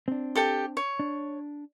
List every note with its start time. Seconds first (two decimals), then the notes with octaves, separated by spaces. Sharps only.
0.08 C4 D4
0.35 G4 A4 G5
0.77 C#5
0.99 D4